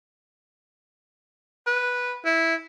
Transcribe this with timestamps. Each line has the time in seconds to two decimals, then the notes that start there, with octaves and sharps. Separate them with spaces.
1.67 B4
2.25 E4